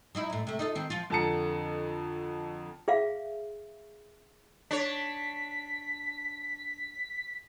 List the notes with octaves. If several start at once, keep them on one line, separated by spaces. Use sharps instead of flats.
F#3 D#4 E4
F#2 A2
C3 A3
D#4 F4 A4
D#3 C4
F3 F4
F2 D3 A5 A#5 C#7
G#4 E5 F5
D4 C#5 B6